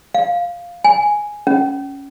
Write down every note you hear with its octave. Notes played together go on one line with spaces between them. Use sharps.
F5
G#5
C#4